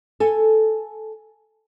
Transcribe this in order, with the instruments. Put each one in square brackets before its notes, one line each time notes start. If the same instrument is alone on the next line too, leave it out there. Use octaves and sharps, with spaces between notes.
[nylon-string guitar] A4 G#5